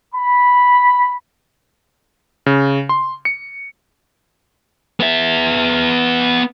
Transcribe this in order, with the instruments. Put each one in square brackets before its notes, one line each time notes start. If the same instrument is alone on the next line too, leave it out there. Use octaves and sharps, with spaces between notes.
[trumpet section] B5
[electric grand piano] C#3
C6
C#7
[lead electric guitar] B3 E5